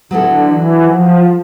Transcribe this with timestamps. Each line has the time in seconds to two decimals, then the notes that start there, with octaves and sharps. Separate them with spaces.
0.11 D3 F#3 B3 E4 A4
0.47 E3
0.83 F3